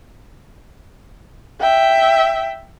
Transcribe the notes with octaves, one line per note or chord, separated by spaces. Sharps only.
E5 G5